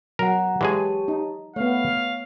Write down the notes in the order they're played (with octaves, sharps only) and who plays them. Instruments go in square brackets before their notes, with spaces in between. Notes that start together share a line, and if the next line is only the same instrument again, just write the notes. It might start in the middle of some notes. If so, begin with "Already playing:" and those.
[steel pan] F#3 [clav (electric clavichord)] A#4 [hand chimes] F#5 A#5
[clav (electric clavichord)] E3 G#3 G#4 [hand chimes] G4 C#5 A5
[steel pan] D#4
[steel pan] A3 B3 [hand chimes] C#5 [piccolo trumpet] F5